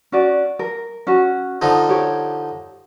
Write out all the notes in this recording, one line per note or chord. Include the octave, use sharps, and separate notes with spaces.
C#4 F#4 D5
A#4
C#4 F#4
D3 F3 D#4
G4 C#5